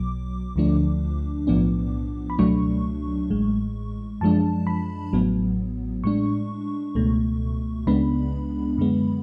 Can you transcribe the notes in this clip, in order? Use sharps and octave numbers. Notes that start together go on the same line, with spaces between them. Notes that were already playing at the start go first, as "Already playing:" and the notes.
Already playing: B1 B2 F#3 D6
D2 D3 F3 A3 D4
B1 A2 F3 B3 D4
B5
C#2 B2 F#3 A3 D4 C#6
A1 A2 G#3
F#2 F3 G#3 D4 A5
B5
A1 A2 F#3 B3
A2 G#3 D4 C#6
C#2 B2 A3
C#2 C#3 G#3 B3 D4 B5
F#2 D3 G#3 B3